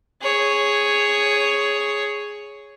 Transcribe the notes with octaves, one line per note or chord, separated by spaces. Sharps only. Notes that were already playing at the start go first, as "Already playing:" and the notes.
G#4 C#5